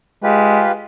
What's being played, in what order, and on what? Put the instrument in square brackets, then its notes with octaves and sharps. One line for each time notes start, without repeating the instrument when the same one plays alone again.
[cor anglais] G#3 [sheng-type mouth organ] F4 G4 B4